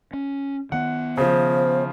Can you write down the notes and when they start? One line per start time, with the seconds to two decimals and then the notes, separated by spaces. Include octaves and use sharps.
0.13 C#4
0.72 D#3 B3 F#5
1.17 C#3 F3 C5